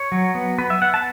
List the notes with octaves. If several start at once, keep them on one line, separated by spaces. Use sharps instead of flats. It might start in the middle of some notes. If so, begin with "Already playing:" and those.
Already playing: C#5
F#3
B3
B3 B4
E5
B3 F#5
A5